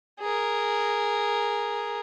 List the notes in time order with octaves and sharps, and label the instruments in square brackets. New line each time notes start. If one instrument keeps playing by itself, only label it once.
[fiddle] G#4 A#4